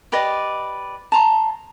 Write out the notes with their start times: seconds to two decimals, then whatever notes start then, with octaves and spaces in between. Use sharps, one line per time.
0.12 G4 B4 D5 D#5
1.12 A5 A#5 C6